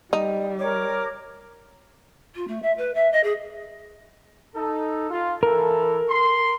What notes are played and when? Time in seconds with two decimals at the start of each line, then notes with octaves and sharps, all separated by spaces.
0.13 G3 D#4
0.59 A#4 C#5 D6
2.35 F4
2.47 A3
2.62 E5
2.77 B4
2.94 E5
3.12 D#5
3.23 G#4
4.55 D#4 A4
5.10 F4
5.43 E3 A4 A#4
6.09 C6